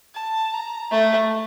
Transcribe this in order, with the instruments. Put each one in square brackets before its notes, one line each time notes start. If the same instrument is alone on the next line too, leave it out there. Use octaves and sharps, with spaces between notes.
[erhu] A5
A#5
[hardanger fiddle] A3